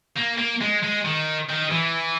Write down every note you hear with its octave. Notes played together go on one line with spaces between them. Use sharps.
A#3
A#3
G#3
G#3
D#3
D#3
E3